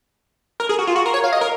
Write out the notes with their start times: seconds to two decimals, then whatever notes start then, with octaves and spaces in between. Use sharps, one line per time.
0.60 A#4
0.69 G#4
0.79 F#4
0.87 F4
0.96 F#4
1.06 A#4
1.14 C#5
1.24 F5
1.33 D#5
1.41 A#4